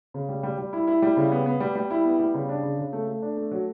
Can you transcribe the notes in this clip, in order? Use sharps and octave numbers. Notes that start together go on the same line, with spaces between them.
C#3
G3
G3
G3
E4
E4
G3
C#3
B3
B3
G3
G3
E4
B3
G3
C#3
D4
C#3
C#3
A3
A3
D4
A3
F#3